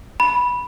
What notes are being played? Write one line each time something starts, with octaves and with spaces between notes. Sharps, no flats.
B5